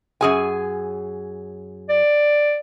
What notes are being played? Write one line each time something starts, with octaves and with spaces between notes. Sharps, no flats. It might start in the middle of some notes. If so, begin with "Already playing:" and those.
F#2 G#4 G#5
D5